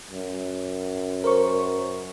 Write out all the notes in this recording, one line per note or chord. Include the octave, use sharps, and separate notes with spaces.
F#2
A#4 C5 C#6